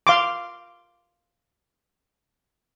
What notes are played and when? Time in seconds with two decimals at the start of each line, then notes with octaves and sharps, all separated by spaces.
0.07 F5 C6 D6